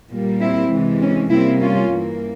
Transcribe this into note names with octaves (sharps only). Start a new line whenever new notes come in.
A#2 G3 A#3
C4 E4
C3 E3 G#3
C#4
C3 G3 A#3 C4 E4
C#4 F4
G2 E3 A#3